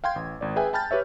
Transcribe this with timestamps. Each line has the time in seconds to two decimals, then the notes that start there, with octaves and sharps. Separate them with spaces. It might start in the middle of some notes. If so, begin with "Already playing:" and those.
0.04 F5 G5 C6 G#6
0.16 A1
0.41 G#1 D5
0.56 G#4 B4 E5 G5 G#5
0.73 G5 A5 B5 F6 G6 A6
0.91 G4 B4 C#5 E5